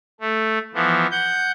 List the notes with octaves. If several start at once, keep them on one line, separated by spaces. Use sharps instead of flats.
A3
E3 F3 B3
F#5 G6